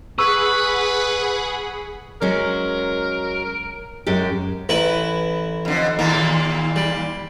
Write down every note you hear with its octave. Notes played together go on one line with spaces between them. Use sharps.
G#4 B4 F#5 B5 C#6 E6
F#3 G#3 C#4 A#4
F#2 G#3 G4
A1 E4 B4
F2 D3
D#2 A#2 A#3
G3